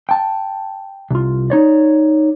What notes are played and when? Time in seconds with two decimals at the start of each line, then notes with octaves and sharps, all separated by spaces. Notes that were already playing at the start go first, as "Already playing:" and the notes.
0.09 G5 A5
1.11 C2 F4
1.50 D#4 C#5 D5